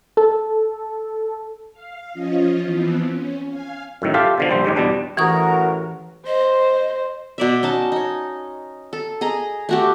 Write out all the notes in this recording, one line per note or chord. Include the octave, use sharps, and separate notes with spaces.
A4
F5
F3 C#4 F4 D#5
E3 F3 B3 C4
C#4
F5 G#5
F#2 A2 D#3
F4 G4 A4 E5 F5
B2 D3 F3
A#1 G3 C5
D#2 G#2 G#3 G4
E2 B2 G3 D4
A1 E3 F#4 A#4 C#6 D#6
C5 D#5
B2 D5 E5
C#4 D#4 A5
D#4 C#5
A4
G#4 D#5 A#5
A3 F#4 G4